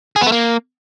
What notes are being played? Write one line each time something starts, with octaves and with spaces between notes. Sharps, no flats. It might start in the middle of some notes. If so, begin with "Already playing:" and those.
G#4
B3
A3
A#3